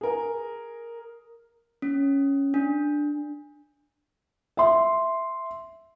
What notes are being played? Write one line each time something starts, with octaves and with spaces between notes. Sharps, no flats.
G#4 A#4
C#4
D4
E5 C6